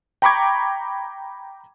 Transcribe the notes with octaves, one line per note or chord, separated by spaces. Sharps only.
G5 A#5 B5 C#6 D6 G#6